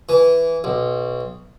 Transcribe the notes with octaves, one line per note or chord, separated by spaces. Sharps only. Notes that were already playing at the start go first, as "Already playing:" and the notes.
E3
B1